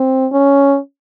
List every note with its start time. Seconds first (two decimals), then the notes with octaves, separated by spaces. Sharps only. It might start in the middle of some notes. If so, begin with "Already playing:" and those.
Already playing: C4
0.32 C#4